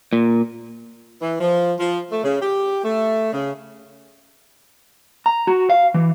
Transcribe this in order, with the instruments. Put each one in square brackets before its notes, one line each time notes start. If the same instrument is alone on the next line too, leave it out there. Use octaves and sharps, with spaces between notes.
[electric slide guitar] A#2
[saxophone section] E3
F3
F3
A3
C#3
G4
A3
C#3
[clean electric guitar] A#5
F#4
F5
E3